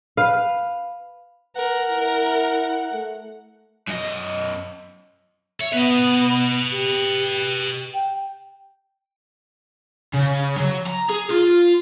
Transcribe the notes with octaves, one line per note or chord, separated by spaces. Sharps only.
B4 F5
A#4 B4 F#5
E4
A3
F#2 D#5
C#5 E5
B3 B4 D#5
G4
G5
C#3
F#3
A#5
G#4
F4